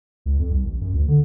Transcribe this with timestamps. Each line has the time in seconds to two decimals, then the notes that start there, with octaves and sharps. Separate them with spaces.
0.26 C#2
0.39 F2
0.51 C2
0.65 A1
0.81 F#2
0.94 D2
1.08 D3